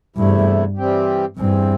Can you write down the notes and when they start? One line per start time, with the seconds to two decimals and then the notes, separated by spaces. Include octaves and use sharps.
0.16 E2 G2 C3 A3 E4
0.77 E3 G3 C4 G4
1.37 E2 G2 E3 C4